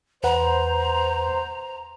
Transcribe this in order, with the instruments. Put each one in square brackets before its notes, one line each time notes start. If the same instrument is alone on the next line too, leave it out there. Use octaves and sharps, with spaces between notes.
[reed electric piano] E2 B4 F#5 [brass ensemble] C5 [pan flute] A#5